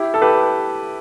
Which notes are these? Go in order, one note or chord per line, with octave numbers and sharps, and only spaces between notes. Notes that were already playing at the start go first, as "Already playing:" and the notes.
Already playing: E4 G4
A4
G4 B4